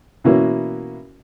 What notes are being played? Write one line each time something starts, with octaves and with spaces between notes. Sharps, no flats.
B2 E3 A#3 C#4 E4 F#4